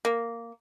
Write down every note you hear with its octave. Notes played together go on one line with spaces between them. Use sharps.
A#3